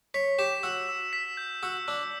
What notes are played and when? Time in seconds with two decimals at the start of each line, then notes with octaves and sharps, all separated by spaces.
0.14 C#5 B6
0.39 G4 E7
0.63 F#4 E6
0.89 E6
1.13 B6
1.37 G6
1.63 F#4 E6
1.88 D4 E6